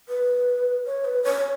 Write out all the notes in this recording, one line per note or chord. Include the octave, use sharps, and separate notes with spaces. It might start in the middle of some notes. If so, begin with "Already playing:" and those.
B4
C#5
B4
C#5